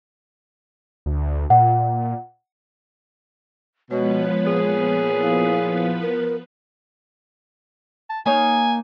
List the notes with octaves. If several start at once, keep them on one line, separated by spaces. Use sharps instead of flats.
D2
A#2 F#5
B2 F3 G#3 B3 B4 C#5
A#2 G#4
E4 F5
A#4
A5
A#3 D#4 C#5 G#5